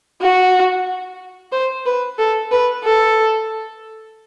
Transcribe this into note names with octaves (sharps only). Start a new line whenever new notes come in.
F#4
C5
B4
A4
B4
A4